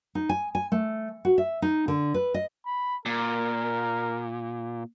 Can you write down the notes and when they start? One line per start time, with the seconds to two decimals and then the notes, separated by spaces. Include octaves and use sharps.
0.15 D#4
0.29 G#5
0.55 G#5
0.72 A3
1.25 F#4
1.38 E5
1.62 D#4
1.88 D3
2.14 B4
2.34 D#5
2.66 B5
3.06 A#2 A#4